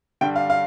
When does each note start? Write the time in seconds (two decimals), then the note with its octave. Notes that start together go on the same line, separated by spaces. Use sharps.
0.21 G2 D3 G3 G5
0.36 F5
0.50 F5